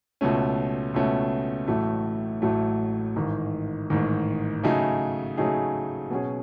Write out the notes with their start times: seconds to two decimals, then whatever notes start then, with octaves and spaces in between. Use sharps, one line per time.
0.21 C#2 B2 A3 C#4
0.94 C#2 B2 A3 C#4
1.68 A1 A2 F#3 A3
2.42 A1 A2 F#3 A3
3.16 A1 G#2 D#3
3.90 A1 G#2 D#3
4.63 C#3 F#3 A3 D#4 G#4
5.37 C#3 F#3 A3 D#4 G#4
6.10 B2 F#3 C#4 G#4